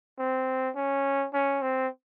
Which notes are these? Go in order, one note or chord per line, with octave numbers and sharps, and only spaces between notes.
C4
C#4
C#4
C4